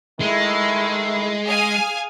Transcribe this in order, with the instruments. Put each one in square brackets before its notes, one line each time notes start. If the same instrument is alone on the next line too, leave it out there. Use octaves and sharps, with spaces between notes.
[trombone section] D#3 A3 E4 [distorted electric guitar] G#3
[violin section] G#4 F5 G#5